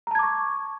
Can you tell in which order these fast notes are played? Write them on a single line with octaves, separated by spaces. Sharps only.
A#5 A5 G#6 D6 C#6